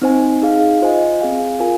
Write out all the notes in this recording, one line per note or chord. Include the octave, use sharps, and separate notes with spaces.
C4 D#4 C5 G#5
D#4 G#4 F5
F4 C5 D#5 G#5
C4 G#4 F5 G#5
F4 A#4 F5 G#5